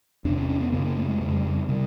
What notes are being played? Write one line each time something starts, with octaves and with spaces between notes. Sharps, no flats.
E2 C3 D4
C#4
C#4
B3
F#2 C#3 A#3
A#3
A3
G#3
F2 C#3 G#3
G3
G3
C3 G3